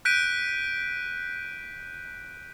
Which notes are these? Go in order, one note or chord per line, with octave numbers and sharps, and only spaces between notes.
F#6 G6 B6 D7 D#7